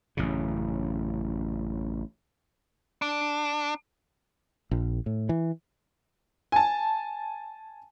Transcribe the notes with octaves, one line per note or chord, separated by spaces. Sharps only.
A1 F#2 C#3
D4
A#1
A2
E3
G#5 A5